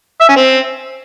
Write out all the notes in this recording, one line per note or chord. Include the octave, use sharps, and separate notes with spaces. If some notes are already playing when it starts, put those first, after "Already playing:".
E5
C#4
C4